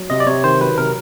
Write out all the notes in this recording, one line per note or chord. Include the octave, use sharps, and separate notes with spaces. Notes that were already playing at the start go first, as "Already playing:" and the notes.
Already playing: F#3
C3 D#5
D5
C3 C#5
D#3 C5
F#3 B4
C3 A#4